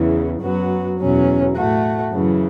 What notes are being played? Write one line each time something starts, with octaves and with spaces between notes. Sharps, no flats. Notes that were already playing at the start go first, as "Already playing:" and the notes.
Already playing: E2 C#3 E3
F#2 F#3 B3 F#4
E2 B2 F#3 C#4
A2 A3 F#4
F#2 C#3 E3